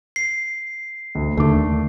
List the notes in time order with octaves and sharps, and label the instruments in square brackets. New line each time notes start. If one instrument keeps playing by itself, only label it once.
[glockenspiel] C7
[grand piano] D2
[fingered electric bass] D#2 D3 [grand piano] A3 D6